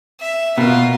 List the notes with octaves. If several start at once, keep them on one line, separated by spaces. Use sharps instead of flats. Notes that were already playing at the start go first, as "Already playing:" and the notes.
E5
B2 F4 A#4